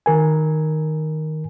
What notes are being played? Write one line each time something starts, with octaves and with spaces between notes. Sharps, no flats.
D#3 A#4 G#5